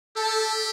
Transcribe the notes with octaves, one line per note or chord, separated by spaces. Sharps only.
G4 A4